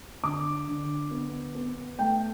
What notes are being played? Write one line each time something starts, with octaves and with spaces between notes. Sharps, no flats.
D3 D6
D3
B3
B3
A3 G5